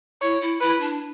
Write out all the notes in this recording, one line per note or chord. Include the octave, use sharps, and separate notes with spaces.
E4 C#5
E4
E4 B4
D4